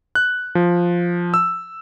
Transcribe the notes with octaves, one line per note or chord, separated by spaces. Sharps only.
F#6
F3
E6